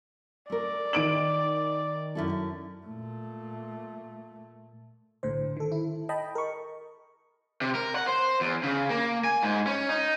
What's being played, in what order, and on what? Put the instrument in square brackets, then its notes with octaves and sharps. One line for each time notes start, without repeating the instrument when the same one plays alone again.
[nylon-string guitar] A3 A#4 [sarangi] D5
[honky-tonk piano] D#3 D7 F#7
[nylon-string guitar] F#2 E4 A4
[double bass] A#2 A3
[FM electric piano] B1 A2 D3 C5
D#3 A4
E4
D#5 G5 A5 B5
A#4 C#6
[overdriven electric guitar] C3
A#4
F#5
C5
E2
C#3
A#3
G#5
G#2
C#4
D#4